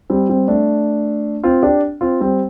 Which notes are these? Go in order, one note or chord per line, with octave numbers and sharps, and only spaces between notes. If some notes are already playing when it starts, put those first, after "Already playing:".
G3 C4
G3 C4
A3 D4
C4 F4
D4 G4
C4 F4
G3 C4